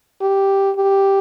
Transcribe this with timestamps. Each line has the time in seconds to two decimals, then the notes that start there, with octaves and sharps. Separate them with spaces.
0.21 G4
0.76 G4